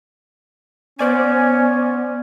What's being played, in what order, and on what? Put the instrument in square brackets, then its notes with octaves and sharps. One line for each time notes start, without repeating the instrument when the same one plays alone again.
[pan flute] B3 [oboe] C#4 [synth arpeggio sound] C5 D5 G#5